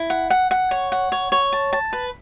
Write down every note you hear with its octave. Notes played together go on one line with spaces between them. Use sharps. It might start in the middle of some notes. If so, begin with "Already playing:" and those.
Already playing: E4
F#5
F#5
F#5
C#5
F#5
C#5
C#5
A5
A5
B4